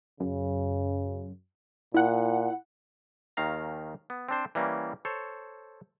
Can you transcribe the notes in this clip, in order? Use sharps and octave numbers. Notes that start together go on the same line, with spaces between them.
F#2 C#3
A#2 E4 F#5
D#2 D#3 F5 A#5
B3
C4 D4 C5
E3 G3 A#3 C#4
A4 C5 C#5